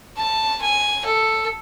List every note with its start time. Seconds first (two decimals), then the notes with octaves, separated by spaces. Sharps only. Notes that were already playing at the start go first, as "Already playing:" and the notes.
0.17 A5
0.62 G#5
1.06 A4